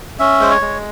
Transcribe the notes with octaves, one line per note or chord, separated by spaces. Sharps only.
C#4 E5
G#3 C5
C#5
G#3